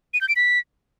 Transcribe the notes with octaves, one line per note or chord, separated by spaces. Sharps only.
D#7
G6
D7
B6